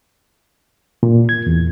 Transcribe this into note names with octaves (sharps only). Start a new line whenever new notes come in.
A#2
G#6
E2